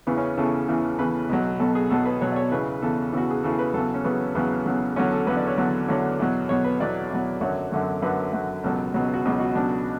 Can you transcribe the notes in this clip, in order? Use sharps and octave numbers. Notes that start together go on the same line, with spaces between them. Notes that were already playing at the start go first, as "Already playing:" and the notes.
E2 C#3 E3 B3
C#4
E2 C#3 E3 A4
E2 C#3 E3
E2 C#3 E3 B4
B1 B2 F#3
B1 B2 F#3 A4
G#4
B1 B2 F#3 A4
B4
B1 B2 F#3 C#5
D5
C#5
E2 C#3 E3 B4
E2 C#3 E3 A4
E2 C#3 E3 F#4
G#4
E2 C#3 E3 A4
B4
E2 C#3 F#3 A4
C#4
E2 C#3 F#3 B3
E2 C#3 F#3 B3
E2 C#3 F#3
E2 D3 F#3 C#4
A4
E2 D3 F#3 B4
D5
C#5
E2 D3 F#3
E2 D3 F#3 C#5
E2 B2 F#3
E2 B2 F#3 C#5
B4
E2 B2 F#3 D5
E2 B2 F#3
F#2 D3 F#3 C#5
F#2 D3 F#3
F#2 D3 F#3 B4
F#2 D3 F#3
C#2 B2 F#3 A4
C#2 B2 F#3
F#4
C#2 B2 F#3 G#4
F#4
C#2 B2 F#3 D4